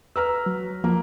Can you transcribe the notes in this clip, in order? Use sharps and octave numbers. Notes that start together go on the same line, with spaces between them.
B4 A#5 E6 F6
F#3
F3 A#3